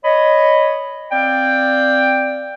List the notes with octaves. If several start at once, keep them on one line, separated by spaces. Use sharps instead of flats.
C#5 D#5 B5
C4 D5 F5 G5